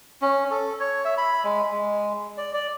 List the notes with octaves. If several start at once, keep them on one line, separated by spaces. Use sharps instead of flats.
C#4
A4
C#5
E5
B5
G#3
G#3
D5
D5